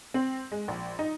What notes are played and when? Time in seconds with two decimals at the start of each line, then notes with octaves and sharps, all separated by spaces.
0.14 C4
0.52 G#3
0.68 A#1
0.99 D#4